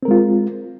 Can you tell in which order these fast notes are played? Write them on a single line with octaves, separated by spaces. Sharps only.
C4 A#4 G#3 F4